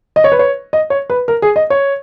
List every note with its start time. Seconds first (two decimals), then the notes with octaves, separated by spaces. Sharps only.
0.16 D#5
0.24 C#5
0.32 B4
0.39 C#5
0.73 D#5
0.90 C#5
1.10 B4
1.28 A#4
1.42 G#4
1.56 D#5
1.70 C#5